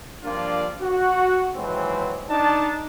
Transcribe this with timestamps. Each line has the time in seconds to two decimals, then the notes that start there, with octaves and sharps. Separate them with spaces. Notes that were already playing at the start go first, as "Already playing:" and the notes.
0.24 F3 G3 A#3 D4 F4 D5
0.81 F#4
1.55 D#2 E3 F#3 G#3 C4
2.29 D4 D#4 A5